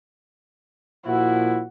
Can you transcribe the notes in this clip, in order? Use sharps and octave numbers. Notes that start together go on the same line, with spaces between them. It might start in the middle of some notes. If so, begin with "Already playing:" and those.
A#2 F3 E4 F#4